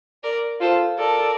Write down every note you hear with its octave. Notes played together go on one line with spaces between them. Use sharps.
A#4 D5
F4 A4 C5
A4 A#4 D5